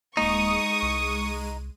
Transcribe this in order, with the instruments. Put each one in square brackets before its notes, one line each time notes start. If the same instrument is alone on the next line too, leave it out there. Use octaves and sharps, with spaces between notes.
[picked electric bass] D#1 A#3 [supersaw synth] G#3 D#7 [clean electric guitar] D#4 [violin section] C#6 D#6
[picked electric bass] C2